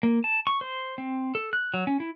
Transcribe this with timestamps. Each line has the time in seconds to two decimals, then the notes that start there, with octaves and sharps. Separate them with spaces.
0.03 A#3
0.24 A5
0.47 C#6
0.61 C5
0.98 C4
1.35 A4
1.53 F#6
1.74 F#3
1.87 C#4
2.00 E4